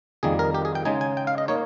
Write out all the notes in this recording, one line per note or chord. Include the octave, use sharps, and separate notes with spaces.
F2 D#3 G3 A#3 G#4
A#4
G4
G#4
G5
C#3 G#3 D#4 G#5
G#5
G5
F5
D#5
A#3 D#4 C#5